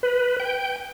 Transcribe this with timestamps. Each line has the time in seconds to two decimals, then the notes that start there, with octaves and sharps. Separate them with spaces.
0.03 B4
0.40 G5